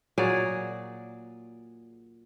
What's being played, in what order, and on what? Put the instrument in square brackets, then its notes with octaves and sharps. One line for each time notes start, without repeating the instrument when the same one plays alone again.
[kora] A#2 F#3 G#4 D5